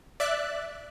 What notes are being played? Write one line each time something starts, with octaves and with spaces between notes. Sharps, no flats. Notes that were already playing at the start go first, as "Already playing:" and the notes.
D5 E5 F#6